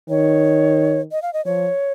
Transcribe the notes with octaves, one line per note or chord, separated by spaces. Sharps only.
D#3 C#5
D#5
F5
D#5
F3 C#5